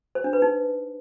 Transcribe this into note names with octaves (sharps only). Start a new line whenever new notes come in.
C5
D4
B4
D#4